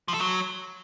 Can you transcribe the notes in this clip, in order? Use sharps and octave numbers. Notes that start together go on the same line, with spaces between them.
F3
A4
F#3